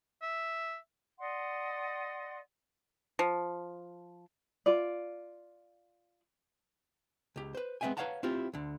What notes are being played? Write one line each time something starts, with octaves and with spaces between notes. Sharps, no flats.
E5
D5 D#5 F#5 C6
F3
F4 D5
C#2 G4
B4 C5
G#3 B3 C4 E5 G5 G#5
B4 C#5 F5 F#5 A5 A#5
C4 E4 F4 G4
D2 D3